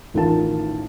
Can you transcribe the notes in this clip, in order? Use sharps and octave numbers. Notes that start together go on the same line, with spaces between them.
A1 D#3 F4 A#4 A5